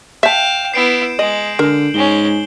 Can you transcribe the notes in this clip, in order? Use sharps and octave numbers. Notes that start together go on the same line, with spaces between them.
E5 F5 G5 A5 G6 E7
B3 E4 C7 D7
G#3 D#5 F#7
D3 A#4
G#2 G#3 C#4 G7